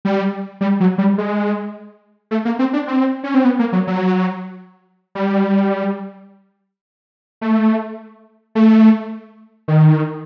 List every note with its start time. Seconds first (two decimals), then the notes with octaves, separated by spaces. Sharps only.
0.05 G3
0.61 G3
0.80 F#3
0.98 G3
1.18 G#3
2.31 A3
2.45 A#3
2.59 C4
2.73 D4
2.87 C4
3.24 C#4
3.34 C4
3.45 B3
3.59 A#3
3.73 F#3
3.87 F#3
5.15 G3
7.41 A3
8.55 A3
9.68 D#3